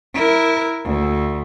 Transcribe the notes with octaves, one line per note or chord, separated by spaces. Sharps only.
E4 A#4
D2